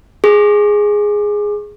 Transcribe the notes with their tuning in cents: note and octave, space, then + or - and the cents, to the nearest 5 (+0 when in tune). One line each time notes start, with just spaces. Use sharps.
G#4 +0 C#6 -25